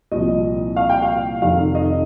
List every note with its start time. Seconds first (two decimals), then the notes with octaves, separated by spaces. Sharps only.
0.12 C2 A#2 F3 D#5
0.76 F5
0.89 G5
1.02 F5
1.42 F1 F2 D#3 F5
1.75 D#5